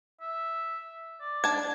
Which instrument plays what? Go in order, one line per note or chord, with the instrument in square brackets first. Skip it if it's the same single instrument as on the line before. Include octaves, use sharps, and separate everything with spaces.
[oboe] E5
D5
[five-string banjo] D4 A5 [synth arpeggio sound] G#6